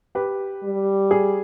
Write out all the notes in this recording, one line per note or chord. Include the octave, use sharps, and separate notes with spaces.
G4 B4
G3
G#4